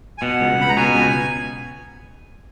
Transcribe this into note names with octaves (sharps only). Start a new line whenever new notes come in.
G#5
B2 F#5
C#2
C#2 B5
A#5
B2 G#5
C#2